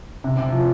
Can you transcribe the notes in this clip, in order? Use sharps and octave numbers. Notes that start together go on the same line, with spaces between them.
C3
C3
F3